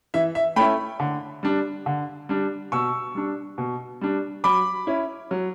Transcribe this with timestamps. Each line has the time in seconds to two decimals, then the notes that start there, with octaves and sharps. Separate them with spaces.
0.14 E3 E5
0.35 E5
0.56 A3 C#4 E4 G5 B5
1.00 D3
1.43 G3 D4
1.86 D3
2.29 G3 D4
2.72 B2 C#6 E6
3.15 G3 D4
3.58 B2
4.01 G3 D4
4.44 F#3 B5 D6
4.87 C#4 E4
5.31 F#3